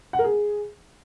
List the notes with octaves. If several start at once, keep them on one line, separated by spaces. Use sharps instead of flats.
F#5
A#4
G#4